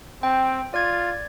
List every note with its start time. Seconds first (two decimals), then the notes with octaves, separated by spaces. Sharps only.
0.23 C4 G5
0.74 F4 D5 G#6